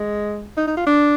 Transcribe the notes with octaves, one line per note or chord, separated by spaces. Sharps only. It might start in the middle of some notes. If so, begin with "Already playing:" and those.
Already playing: G#3
D#4
D#4
F4
D4